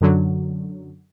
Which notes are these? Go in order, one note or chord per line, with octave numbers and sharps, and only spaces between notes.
F#2 D3 F#3